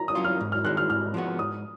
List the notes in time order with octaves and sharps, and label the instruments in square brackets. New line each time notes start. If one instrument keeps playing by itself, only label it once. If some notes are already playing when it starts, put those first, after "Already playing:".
Already playing: [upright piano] A#5
D#6
[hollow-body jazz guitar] F#3 C#4 F4
[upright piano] F6
[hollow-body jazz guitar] G#2
[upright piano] F6
[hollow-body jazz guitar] D#3 G#3 [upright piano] F#6
[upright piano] F6
[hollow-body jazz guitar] G#2 [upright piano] F6
[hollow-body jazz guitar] F3 G#3 B3 F#4
[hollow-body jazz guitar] G#2 [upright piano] D#6